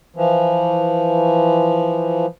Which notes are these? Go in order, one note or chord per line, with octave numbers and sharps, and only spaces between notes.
E3 F3